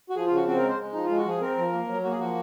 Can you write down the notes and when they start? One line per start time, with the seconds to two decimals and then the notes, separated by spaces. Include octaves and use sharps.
0.10 F#4
0.16 F3 G#4
0.26 F4
0.32 C#3 F#4
0.47 C4 F#4
0.58 A#4
0.63 G#3
0.69 C5
0.79 G#3
0.93 F3 D#4
1.05 F4
1.10 G#3
1.17 F#4
1.25 F3 G#4
1.41 C4 A#4
1.58 F3
1.72 A#3
1.88 F#3
2.04 A#3 F#4
2.11 G#4
2.19 F3 F#4